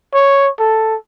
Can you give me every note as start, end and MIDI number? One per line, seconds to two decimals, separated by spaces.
0.13 0.48 73
0.59 0.96 69